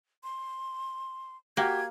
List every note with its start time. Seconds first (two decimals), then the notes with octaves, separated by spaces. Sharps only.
0.24 C6
1.57 A#3 F#4 G4 G5 G#6